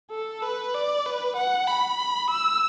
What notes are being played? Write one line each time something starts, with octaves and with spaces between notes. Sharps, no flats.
A4
B4
D5
B4
F#5
B5
E6